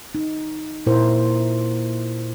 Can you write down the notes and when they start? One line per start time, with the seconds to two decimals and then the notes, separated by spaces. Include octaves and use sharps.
0.15 D#4
0.86 A#2 E4 A#4 C5